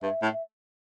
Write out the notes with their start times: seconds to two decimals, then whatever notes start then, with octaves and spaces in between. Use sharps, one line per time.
0.02 G2 E5
0.22 A2
0.33 E5